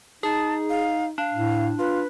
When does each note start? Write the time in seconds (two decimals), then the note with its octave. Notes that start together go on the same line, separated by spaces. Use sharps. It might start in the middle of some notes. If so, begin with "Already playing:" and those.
0.23 D#4 G#4 A5
0.70 F5
1.18 D4 F5
1.34 A2
1.79 F4 B4